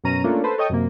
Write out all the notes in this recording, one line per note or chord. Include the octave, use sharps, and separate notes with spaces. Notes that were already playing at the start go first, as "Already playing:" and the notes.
F#2 B2 C#4 A#5 D#7
A3 A#3 C#4 D4 F4 A4
A4 B4 C5
A4 C#5 D#5 G5 C#6 D#6
F#2 C3 A#3